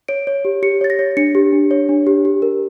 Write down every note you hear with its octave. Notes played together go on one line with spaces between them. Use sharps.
C#5 D7
C#5
G4
G4 C#7
C#5 A6
A#6
C#5
D4 C#7
G4
D4
C#5
D4
G4
G4
A#4